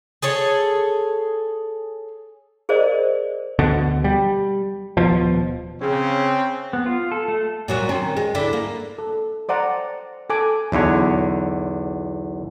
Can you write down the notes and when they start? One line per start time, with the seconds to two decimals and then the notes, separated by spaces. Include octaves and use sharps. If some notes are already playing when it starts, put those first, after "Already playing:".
0.22 G#4 A4 C#5
2.69 G#4 A#4 C5 D5 D#5
3.59 D2 B2 D3
4.04 G3
4.97 D#1 B2 F3
5.82 C#3 C4 C#4 G#4
6.73 B3
6.86 F4
7.11 A4
7.28 A3
7.68 A#2 F#3 F#4
7.89 D#3 C4 C#4
8.17 G#3
8.35 D3 E4
8.53 A#3
8.98 A4
9.49 C5 D5 F#5 A#5 D6
10.30 A4 G#5 D6
10.72 B1 E2 D3 C#5